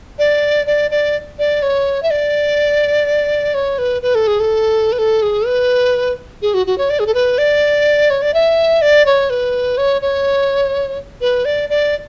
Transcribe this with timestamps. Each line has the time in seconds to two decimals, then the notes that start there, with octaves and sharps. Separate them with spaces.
0.19 D5
0.67 D5
0.91 D5
1.39 D5
1.62 C#5
2.03 E5
2.11 D5
3.54 C#5
3.78 B4
4.02 B4
4.15 A4
4.27 G#4
4.40 A4
4.92 B4
4.99 A4
5.22 G#4
5.46 B4
6.42 G#4
6.54 F#4
6.67 F#4
6.78 C#5
6.90 D5
6.99 G#4
7.07 A4
7.14 B4
7.38 D5
8.10 C#5
8.22 D5
8.34 E5
8.82 D5
9.06 C#5
9.30 B4
9.78 C#5
10.02 C#5
11.21 B4
11.45 D5
11.70 D5